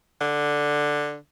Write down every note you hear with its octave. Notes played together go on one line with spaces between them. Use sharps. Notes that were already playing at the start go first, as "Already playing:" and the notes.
D3